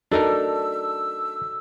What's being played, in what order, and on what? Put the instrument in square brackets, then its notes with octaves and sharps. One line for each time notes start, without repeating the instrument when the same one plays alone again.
[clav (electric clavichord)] D4 D#4 A#4 [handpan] F#4 A4 D5 [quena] E6